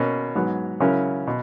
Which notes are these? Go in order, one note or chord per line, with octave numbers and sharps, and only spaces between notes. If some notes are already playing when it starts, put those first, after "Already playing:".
Already playing: B2 A#3 C#4
G#2 F#3 B3
C#3 F#3 C#4 E4 A#4
B2